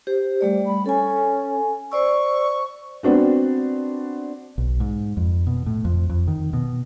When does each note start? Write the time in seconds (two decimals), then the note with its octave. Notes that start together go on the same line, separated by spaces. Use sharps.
0.07 G4 C5
0.41 G3 A3 D5
0.66 B5
0.86 C#4 A4 G#5
1.92 C5 D5 C#6 E6
3.03 B3 C4 D4 F#4
4.58 B1
4.80 G#2
5.17 F2
5.47 B2
5.67 A2
5.85 F2
6.09 F2
6.28 D#3
6.53 B2